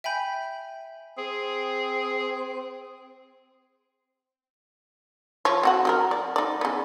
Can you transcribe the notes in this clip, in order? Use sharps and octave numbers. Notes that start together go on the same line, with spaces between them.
E5 G5 G#5 B5 G6
C4 G#4
F3 C#5
C4 F#4 F#5
F#3 G4 A#4
D5
D#4 D5
C#3 B3